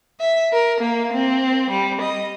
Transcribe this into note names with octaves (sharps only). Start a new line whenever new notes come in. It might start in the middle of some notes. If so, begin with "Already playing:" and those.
E5
A#4
A#3
C4
G3
D#5